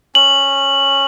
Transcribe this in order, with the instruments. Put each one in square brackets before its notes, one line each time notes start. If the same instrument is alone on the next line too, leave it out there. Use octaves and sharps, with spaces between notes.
[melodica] C#4 [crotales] F#7